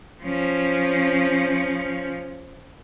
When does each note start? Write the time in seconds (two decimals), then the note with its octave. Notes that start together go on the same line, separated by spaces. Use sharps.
0.23 F3 C#4